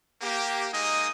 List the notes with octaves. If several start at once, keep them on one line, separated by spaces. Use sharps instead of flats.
A#3 G4
G#3 A#3 D#4 D#5 D#6